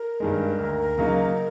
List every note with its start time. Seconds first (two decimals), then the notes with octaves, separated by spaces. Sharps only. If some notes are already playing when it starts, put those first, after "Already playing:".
Already playing: A#4
0.20 G2 D#3 G#3
0.59 D2
0.98 C#3 F#3 A#3 D#4